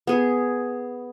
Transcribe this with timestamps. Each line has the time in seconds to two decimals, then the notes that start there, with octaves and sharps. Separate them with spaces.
0.07 B3 G#4